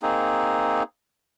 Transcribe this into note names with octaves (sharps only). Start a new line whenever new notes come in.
A#3 C4 D#4 G#4